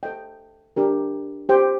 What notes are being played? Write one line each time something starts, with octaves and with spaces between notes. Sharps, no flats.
A4 D#5 G5
D4 G4 A#4
G4 C5 G5